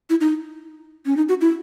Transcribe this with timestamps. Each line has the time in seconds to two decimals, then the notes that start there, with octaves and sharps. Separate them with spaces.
0.10 E4
0.21 D#4
1.06 C#4
1.17 D#4
1.29 F#4
1.41 E4